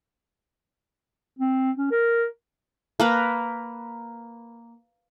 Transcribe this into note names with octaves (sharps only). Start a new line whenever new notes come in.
C4
C#4
A#4
A#3 A#4 B4